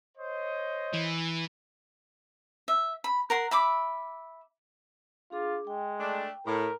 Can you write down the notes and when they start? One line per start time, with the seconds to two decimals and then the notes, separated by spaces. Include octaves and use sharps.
0.18 C5 C#5 D#5
0.93 E3
2.68 E5
3.04 B5
3.30 A#4 F#5 C6
3.51 E5 B5 D6
5.31 D4 F4 G#4 D6
5.67 G#3 G5
6.00 A3 D4
6.47 A2 A#4